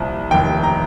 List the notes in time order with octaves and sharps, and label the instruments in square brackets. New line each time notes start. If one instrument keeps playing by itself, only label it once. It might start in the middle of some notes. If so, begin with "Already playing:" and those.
Already playing: [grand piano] C2 A#2 F3
F1 D#2 D#3 G5
A#5